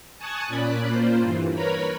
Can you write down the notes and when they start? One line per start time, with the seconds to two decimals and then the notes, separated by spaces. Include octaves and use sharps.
0.18 G#5 A5 C#6 D#6 F#6 G#6
0.48 A#2 C#4 D5 B5 F#6
0.87 A#3 F4 C5
1.21 G2 E3
1.54 A#4 B4 C#5 A#5 B5